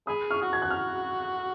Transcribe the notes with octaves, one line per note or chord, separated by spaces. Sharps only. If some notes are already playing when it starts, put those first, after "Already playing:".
G#4 B5 D#6
C#6 F6
F#4
G#6
F#6
F6